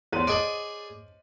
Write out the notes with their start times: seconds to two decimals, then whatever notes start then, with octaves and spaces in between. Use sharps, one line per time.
0.12 E2 C5 C#5 C6 D#7
0.27 G#4 C5 D5 D#5 D#6 D7 F#7